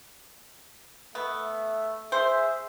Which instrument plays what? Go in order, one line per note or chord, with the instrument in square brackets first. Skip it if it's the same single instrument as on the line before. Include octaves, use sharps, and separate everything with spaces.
[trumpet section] A3 E5 [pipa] B3
[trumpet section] G#4 E5 [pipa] C5